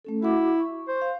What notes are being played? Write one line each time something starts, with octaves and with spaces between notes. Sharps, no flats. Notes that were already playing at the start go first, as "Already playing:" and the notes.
A3 C#4 A4
E4 F#4 F#5 D6
C#6
C5
F5